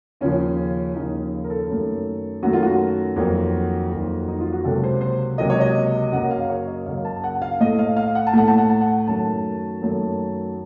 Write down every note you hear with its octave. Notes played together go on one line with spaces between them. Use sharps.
D#2 C#3 F3 C#4
D#2 C#3 F3 D#4
A#4
A4
F#2 D#3 A3
F#2 D#3 A3 F#4
F4
F#4
F2 D#3 F#3 A#3
F2 D#3 F#3 A#3
D#4
F4
F#4
C#2 C3 F#3 A#3 A4
C5
C5
C#2 C3 F#3 A#3 D#5
C#5
D#5
F#2 C#3 F#3 A#3 F#5
F5
C#5
D#5
F#2 C#3 F#3 A#3 F5
A5
F#5
F5
A2 A3 D#5
F5
F5
F#5
A5
A2 A3 F#5
A5
F#5
A5
F#5
F#2 D#3 F#3 A3 A5
F#2 D#3 F#3 A3